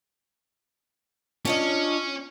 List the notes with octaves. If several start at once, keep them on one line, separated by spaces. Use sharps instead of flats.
C#4 D4 F4 D#5